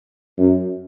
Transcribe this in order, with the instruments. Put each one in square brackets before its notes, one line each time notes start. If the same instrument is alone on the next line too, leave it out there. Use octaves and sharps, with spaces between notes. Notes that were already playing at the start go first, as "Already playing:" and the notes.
[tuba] F#2